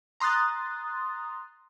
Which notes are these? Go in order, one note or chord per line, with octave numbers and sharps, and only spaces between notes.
A#5 C6 D#6 F#6 A6